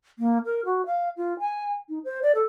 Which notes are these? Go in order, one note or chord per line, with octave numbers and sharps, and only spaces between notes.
A#3
A#4
F#4
F5
F4
G#5
D#4
C5
D5
A4